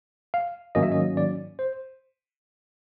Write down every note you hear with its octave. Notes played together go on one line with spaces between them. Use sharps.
F5
G#2 D#3 F#3 A#3 C#4 D#5
E5
D#5
D5
C5